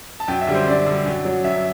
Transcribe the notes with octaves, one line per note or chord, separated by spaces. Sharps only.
A5
F#2 G5
E5
D3 G3
C5
F#2 D5
D3 G3
F#2
F#3
F#2 E5